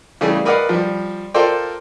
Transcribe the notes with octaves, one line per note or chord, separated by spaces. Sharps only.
C#3 E3 G3 A3 G#4
A#4 B4 D5 D#5 F5 F#5
F3 G3
F4 A4 A#4 C5 D5 G5